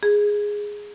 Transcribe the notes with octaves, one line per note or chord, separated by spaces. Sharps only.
G#4